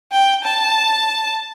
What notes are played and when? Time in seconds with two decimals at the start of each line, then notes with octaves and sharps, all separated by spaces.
0.12 G5
0.44 A5